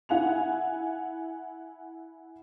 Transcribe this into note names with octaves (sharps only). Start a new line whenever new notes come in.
E4 F#5 G#5 F7